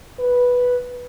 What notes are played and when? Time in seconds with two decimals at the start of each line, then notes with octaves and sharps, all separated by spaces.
0.19 B4